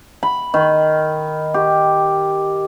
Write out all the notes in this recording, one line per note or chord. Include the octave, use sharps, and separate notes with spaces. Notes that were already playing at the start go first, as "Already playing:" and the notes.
B5
D#3
G4